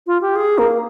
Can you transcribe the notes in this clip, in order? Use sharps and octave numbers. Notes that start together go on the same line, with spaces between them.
F4
G4
G#4
A#3